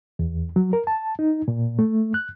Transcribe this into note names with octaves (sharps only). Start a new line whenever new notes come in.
E2
F#3
A#4
A5
D#4
A#2
A3
F#6